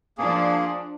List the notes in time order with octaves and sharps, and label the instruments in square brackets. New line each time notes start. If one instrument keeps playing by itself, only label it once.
[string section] F3 D4 [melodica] A#3 G#4